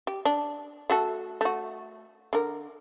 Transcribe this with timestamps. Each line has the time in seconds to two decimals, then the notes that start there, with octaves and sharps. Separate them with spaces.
0.07 G4
0.25 D4
0.90 A3 F#4 A4
1.41 A3 F#4
2.33 D3 A#4